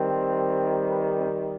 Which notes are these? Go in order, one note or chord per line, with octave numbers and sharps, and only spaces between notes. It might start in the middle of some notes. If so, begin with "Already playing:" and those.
Already playing: D#3 G3 C4
B4
C4